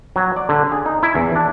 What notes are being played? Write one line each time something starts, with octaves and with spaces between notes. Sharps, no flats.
F#3
D5
D3
G#4
D#4
E4
E2
D4